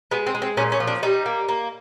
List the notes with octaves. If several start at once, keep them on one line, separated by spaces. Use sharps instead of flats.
G#3 B3
C4
G#3
C4
A#2 C#4
C#4
F3
D4
G3 D#4
A#3
A#3